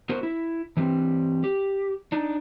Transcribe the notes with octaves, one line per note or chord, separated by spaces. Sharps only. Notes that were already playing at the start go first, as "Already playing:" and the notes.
B3 F#4 A#4 C5
E4
E3 G3 C4
G4
D4 D#4